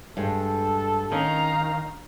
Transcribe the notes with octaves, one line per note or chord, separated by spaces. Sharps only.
G2 G#3 A4
D#3 C#4 F5 A#5